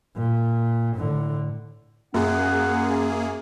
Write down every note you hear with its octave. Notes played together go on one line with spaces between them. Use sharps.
A#2
A2 D3
F#2 A#3 C#4 G#4 F#5